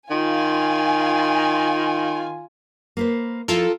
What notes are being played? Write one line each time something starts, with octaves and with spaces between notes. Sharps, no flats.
D#3 F4 G#5
A#3 B4 C5
F3 E4 F4 A4 A#4